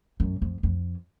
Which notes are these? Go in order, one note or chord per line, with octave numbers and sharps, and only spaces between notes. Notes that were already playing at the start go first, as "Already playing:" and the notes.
F#2
F2
F2